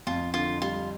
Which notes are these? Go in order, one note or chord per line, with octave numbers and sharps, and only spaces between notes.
F2 F4
D3 F4
G3 F4